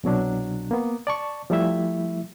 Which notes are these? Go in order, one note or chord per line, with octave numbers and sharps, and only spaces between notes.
C2 B2 F#3 D4
A#3 B3
D5 A5 C#6
F3 G3 A3 E4 E5